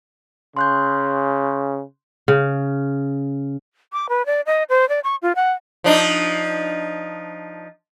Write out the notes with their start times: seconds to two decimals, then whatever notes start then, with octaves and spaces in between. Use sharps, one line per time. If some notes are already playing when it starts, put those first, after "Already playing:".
0.57 C#3 C6 F#6 G6
2.28 C#3
3.93 D6
4.09 B4
4.26 D5
4.46 D#5
4.69 C5
4.89 D5
5.04 C#6
5.22 F4
5.36 F#5
5.84 F3 D4 D#4